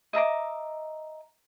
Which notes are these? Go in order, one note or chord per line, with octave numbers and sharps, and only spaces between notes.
D#5 E5 A#5 D6